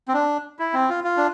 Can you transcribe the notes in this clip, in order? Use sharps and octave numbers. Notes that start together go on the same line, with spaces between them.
C4
D4
E4
C4
F4
F4
D4